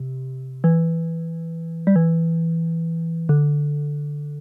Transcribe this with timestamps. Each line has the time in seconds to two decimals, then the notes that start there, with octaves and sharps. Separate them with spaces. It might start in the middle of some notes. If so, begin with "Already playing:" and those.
Already playing: C3
0.64 E3
1.87 G3
1.96 E3
3.29 D3